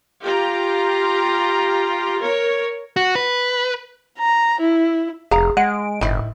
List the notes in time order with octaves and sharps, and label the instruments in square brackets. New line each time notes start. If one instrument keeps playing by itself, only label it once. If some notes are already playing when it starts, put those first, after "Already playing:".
[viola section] F4 G4 A#5
A#4 C#5
[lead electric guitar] F#4
B4
[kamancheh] A#5
E4
[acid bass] F1 [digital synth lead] G#4 [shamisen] F5 A#5
[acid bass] G#3 [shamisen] F#5 [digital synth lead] D7
[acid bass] G1 [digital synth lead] A2 [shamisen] D#3 E4